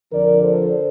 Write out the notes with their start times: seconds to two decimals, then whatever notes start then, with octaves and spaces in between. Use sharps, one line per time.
0.12 F2 D3 F3 A#4 D5
0.41 A4 C5